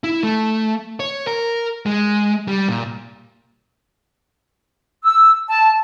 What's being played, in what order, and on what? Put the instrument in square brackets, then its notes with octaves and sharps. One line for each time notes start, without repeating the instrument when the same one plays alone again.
[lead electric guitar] E4
A3
C#5
A#4
G#3
G3
A#2
[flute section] E6
A5